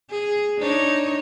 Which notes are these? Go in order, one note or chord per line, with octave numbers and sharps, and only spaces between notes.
G#4
D4 D#4 C#5